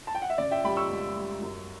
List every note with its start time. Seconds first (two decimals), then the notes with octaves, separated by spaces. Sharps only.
0.07 A5
0.15 G5
0.22 F#5
0.30 E5
0.38 C#3 D5
0.51 E5 G5
0.64 G3 G5 B5
0.77 C#6 E6
0.90 C#2
1.16 G3
1.41 F#2